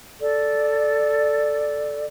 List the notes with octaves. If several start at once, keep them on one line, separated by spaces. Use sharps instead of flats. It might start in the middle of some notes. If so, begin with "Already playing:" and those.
A4 D5